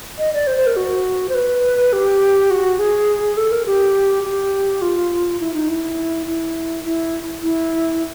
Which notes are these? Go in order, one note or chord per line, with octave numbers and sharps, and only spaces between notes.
D#5
D5
C5
C5
A#4
F#4
C5
B4
G4
F#4
G#4
A4
A#4
G4
G4
F4
E4
D#4
E4
E4
E4
E4